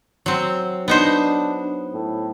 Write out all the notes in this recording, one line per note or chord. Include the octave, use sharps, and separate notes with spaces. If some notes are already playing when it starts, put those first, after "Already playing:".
F#3 C4
B3 D4 D#4 C5
A2